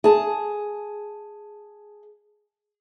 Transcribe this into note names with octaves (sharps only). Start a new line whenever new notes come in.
G#4 A5